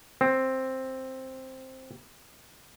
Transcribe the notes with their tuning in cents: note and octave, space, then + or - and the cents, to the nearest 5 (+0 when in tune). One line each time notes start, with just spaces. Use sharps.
C4 +5